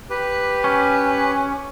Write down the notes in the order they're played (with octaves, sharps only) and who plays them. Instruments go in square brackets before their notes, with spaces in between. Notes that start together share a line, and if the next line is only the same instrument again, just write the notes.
[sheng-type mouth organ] G4 B4
[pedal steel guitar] C#4